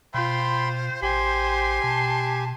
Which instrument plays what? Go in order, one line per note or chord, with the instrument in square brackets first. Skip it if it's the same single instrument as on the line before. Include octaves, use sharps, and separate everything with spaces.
[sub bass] B2 [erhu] F4 [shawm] C5 [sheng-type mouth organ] G5 B5 C6
[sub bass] A1 [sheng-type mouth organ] G4 G#5 [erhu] C5 [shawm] C6
[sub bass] B2 [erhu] A5